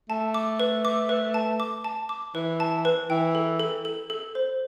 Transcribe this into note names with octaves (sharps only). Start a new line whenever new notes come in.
A3 A5
D6
B4
D6
B4
A5
D6
A5
D6
E3 B4
A5
B4
E3 G5
A4
A4
A4
A4
C5